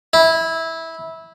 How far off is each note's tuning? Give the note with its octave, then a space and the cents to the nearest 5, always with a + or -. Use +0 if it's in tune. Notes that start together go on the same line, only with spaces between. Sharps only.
E4 -15